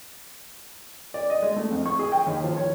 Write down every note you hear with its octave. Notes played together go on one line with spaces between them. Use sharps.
D5
D#5
G#3
A3
F2
C#6
G#4
G5
D#2
F3
C#5